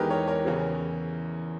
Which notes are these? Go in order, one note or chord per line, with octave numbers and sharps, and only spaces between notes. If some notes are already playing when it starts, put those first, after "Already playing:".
Already playing: E2 D#3 G#3 G4 G#4 A#4 B4
A#4 C#5
A#4 C#5
E2 C#3 E3